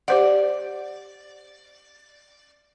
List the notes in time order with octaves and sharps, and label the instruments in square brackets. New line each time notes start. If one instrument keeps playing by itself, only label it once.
[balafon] G4 C5 F#5 [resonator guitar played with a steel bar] D5